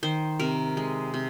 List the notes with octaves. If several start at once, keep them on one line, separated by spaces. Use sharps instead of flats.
D#3 C5
C3 A#4
G#3
C3